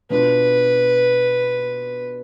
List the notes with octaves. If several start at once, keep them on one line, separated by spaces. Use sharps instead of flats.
B2 B3 D4 F4 B4